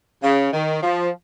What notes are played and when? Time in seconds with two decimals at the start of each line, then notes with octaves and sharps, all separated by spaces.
0.23 C#3
0.53 D#3
0.82 F3